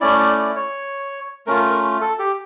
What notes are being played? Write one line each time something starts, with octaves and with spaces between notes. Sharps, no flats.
A3 C#4 E4 D5
D5
D5
C#5
A3 C#4 F4 A#4
A#4
A4
G4